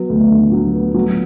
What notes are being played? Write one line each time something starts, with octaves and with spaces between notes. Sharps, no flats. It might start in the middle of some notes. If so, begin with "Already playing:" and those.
Already playing: F#3 B3
D2
D3
F#3
B3
F#3